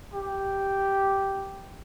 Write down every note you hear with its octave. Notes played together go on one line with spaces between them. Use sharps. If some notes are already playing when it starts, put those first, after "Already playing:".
G4